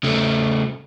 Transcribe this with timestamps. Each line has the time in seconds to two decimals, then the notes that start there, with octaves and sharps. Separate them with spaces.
0.03 C#3 A3